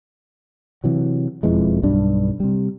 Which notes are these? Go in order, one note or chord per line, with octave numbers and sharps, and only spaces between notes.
C3 E3 F#3
E1 F2 E3 G#3
B1 G2 G3 D4
C3 G3